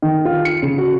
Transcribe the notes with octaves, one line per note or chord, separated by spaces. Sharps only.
D#3
F4
C#7
C#3
F#4